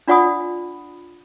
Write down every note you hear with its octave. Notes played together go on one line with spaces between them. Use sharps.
D4 F4 D5 F#5 B5 D#6